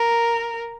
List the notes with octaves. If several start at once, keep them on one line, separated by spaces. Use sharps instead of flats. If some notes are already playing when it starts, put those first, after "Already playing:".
Already playing: A#4